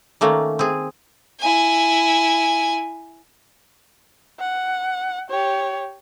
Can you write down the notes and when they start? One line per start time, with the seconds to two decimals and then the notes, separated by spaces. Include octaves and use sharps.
0.21 D#3 A3 A#3 C#4
0.59 C4 G#4
1.40 E4 G#5
4.39 F#5
5.30 G4 C#5